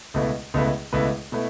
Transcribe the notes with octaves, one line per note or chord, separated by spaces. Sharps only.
C#2 B2 A3 E4 B4
C#2 B2 A3 E4 B4
C#2 B2 A3 E4 B4
B2 A3 E4 B4